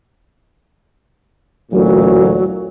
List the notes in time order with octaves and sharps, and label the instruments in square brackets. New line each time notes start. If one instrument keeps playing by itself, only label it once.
[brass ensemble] A1 D2 A#2 [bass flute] F#3